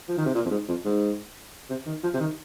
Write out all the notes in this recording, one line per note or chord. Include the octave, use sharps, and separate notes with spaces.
F3
D#3
C3
A#2
F2
G#2
F2
G#2
C3
D#3
F3
C3
D#3